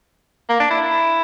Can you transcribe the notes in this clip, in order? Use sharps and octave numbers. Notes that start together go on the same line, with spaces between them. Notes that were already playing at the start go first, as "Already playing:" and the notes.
A#3
D4
E4